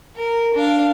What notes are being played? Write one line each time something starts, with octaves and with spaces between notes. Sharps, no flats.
A#4
D4 F5